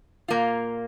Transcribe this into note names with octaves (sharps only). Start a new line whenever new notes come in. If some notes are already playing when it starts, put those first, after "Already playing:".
A#2 A#3 F4